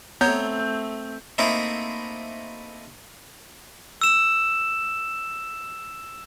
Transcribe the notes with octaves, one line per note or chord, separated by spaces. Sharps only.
A3 B3 C4 C#5 A#5 G6
A3 A#3 C4 D#4 E4
E6 E7